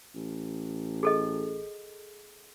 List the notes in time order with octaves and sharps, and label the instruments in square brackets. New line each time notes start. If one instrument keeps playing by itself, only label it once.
[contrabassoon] A1
[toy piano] G#4 A4 D#5